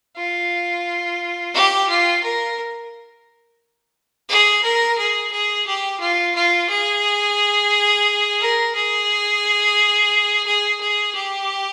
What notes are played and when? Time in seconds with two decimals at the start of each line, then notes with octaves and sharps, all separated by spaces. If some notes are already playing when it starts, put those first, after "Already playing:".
0.17 F4
1.54 G4
1.89 F4
2.23 A#4
4.29 G#4
4.63 A#4
4.98 G#4
5.32 G#4
5.67 G4
6.00 F4
6.35 F4
6.69 G#4
8.40 A#4
8.75 G#4
10.46 G#4
10.80 G#4
11.15 G4